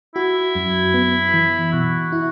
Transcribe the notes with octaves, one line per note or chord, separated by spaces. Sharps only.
E4 F#4
F#2
B3
E3
B2 F#4
E4